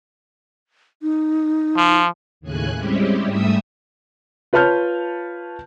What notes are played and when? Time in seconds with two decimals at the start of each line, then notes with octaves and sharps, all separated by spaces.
1.02 D#4
1.77 F3
2.41 D#2 A2 C#3 G#5 F#6
2.76 G3 G#3 C4 C#4 E4 G4
3.25 G#2 G3 A3 E5 D#6 E6
4.53 F4 B4 C#5 A5 F6 G6